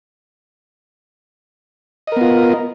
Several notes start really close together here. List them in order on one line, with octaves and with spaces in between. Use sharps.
D#5 A#4 B3 F4